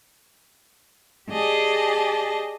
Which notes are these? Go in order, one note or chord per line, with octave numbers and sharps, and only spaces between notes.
G4 G#4 D5 D#5 A5